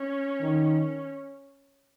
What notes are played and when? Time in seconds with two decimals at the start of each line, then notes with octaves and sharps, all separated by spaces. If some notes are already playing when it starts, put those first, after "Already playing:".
Already playing: C#4
0.41 D#3